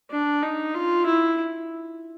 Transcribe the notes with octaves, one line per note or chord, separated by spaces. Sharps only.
D4
D#4
F4
E4